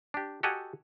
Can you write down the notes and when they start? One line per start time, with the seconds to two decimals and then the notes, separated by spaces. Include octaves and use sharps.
0.14 D4 G4
0.43 F#4 G4 A4 D#5 F#5 G#5